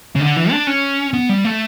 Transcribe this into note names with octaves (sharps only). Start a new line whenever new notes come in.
C#3
D3
E3
D4
C#4
B3
G3
A3